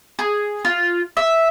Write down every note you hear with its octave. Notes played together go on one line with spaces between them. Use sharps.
G#4
F4
E5